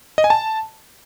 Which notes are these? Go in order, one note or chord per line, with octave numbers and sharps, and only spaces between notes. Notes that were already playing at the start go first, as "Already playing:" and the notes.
D#5
G#5
A5